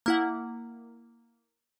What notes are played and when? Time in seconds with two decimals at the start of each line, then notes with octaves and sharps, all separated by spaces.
0.06 A#3 E4 F#5